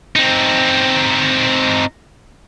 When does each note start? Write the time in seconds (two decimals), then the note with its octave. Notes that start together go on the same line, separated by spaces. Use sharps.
0.16 C4 D#4